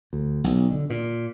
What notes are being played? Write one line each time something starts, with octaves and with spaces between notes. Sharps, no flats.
D2
B1
D3
A#2